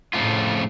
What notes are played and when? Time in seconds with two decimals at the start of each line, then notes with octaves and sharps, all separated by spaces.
0.13 F2 A2 C#3 F3 A3 F4